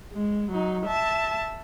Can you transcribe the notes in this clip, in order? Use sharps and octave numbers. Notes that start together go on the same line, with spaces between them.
G#3
F#3 D#4
E5 A5